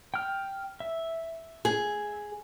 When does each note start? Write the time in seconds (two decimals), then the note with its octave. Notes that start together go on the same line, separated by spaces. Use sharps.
0.14 G5 F6
0.80 E5
1.65 G#4